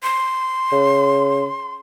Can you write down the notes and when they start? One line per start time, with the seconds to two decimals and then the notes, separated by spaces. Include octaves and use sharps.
0.03 C6
0.72 C#3